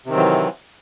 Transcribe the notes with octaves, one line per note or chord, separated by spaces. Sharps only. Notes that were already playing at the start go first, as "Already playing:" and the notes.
C3 D#3 E3 F#3 C4